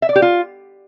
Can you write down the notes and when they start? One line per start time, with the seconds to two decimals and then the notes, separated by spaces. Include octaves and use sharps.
0.02 E5
0.09 D5
0.16 G4
0.22 F4